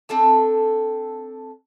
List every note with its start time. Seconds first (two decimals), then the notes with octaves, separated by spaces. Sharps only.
0.09 C4 D4 A4 A5